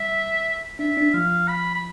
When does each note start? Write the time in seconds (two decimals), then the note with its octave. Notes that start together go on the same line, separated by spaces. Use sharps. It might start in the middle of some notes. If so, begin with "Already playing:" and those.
Already playing: G3 E5
0.79 D4 E5
0.97 D4
1.14 F3 F5
1.48 B5
1.75 B5